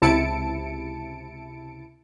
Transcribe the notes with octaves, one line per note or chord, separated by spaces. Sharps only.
C#2 C3 E4 A5 C#7 D7